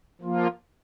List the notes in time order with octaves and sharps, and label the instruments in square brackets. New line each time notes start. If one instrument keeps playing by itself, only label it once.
[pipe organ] F3 A#3 F4